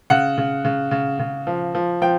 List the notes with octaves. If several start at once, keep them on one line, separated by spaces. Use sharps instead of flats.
C#3 F#5
C#3
C#3
C#3
C#3
F3
F3
F3 G5